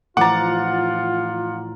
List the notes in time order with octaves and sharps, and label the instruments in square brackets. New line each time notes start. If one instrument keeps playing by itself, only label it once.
[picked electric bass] A2 E3 F3 [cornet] F4 [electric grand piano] F#5 A6 [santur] A#5 D6